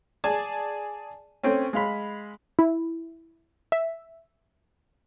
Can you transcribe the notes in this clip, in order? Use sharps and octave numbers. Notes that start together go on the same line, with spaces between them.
G#4 D5 G#5 A5
A3 C4 C#4
G#3 F5 B5
E4
E5